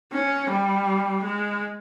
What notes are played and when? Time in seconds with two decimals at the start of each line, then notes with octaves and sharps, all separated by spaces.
0.12 C#4
0.49 G3
1.23 G#3